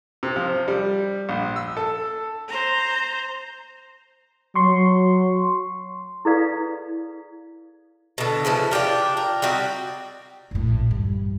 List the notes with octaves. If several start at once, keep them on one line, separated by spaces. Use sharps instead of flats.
C3
F3
G3
A#1
E6
A4
C5 A#5
F#3 C6 C#6
E4 G#4 A4 B4 D5 F5
B2 D3
C#3 E3 F3
D4 F4 G4 A#4
A#4
G3 C4 D#4 F#4
A#1 A2
G2 E3